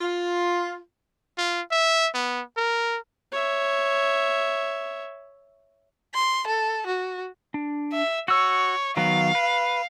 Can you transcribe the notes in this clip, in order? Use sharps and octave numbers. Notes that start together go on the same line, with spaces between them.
F4
F4
E5
B3
A#4
C#5 E5
C6
A4
F#4
D4
E5
F#4 C#5 E6
D#3 F#3 B3 F5
B4